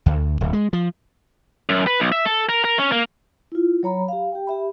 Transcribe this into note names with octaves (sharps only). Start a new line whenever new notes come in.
D2
D1
G#3
F3
F#2
B4
B1
E5
A4
A#4
A#4
C#4
A#3
E4 F4
F#3 C#5 A#5 B5
G4 F5
G4 G5
G4 E5 B5